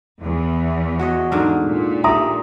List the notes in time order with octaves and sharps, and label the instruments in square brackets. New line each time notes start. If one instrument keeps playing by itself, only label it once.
[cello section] E2
[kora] F#4 C#5 D#5
G#2 D3 A#4
[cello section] A#2
[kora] G4 D5 [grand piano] E5 A#5 D#6